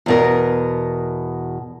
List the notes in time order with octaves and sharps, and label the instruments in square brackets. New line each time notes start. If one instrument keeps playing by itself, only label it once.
[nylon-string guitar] E2 B2 A#4